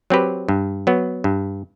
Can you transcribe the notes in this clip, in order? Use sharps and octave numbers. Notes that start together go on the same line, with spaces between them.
F#3 C4 G4 B4
G2
F#3 B3
G2